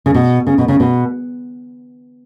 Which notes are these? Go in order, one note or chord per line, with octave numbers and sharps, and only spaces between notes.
C#3
B2
C#3
B2
C#3
B2